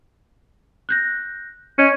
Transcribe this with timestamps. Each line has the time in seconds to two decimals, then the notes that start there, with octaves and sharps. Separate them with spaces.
0.89 F#6 G6 A#6
1.78 C#4 C#5 D#5 G#6